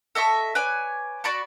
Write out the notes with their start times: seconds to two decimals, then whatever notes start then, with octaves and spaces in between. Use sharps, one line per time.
0.15 A4 D#5 E5 C#6
0.55 B4 C#5 D5 G#5
1.24 F#4 D5 B5 C#6